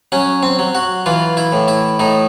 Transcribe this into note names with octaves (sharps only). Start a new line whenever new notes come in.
F#3 C#4
C4
F#3
F#4
E3 F4
E4
A2
E4
A2 D#4